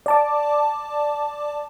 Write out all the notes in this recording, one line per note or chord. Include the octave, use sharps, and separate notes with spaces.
D5 A5 D6